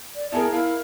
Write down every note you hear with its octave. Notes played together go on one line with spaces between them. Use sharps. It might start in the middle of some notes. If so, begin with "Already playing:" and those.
D5
B3 E4 G#4 A#4 A5
E4 A#4 F5